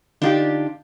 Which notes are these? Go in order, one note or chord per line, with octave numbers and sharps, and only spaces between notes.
D3 D4 D#4 F4 G4